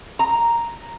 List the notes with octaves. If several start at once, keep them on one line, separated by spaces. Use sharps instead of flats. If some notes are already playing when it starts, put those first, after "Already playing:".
A#5